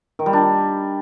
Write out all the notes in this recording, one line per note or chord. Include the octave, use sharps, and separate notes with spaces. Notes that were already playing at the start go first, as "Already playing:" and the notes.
D#3
G3
D4